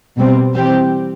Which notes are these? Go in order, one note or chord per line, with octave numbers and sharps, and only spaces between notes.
B2 G3 C4
E3 G3 C4 G4